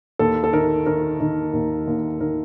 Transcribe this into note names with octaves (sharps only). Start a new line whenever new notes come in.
D#2 A4
A4
D#3 A#4
D#3 A#4
D#3
D#2
D#2
D#3 A#4